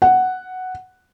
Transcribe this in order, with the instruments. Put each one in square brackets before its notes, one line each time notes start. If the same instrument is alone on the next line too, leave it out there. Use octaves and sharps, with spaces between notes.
[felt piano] F#5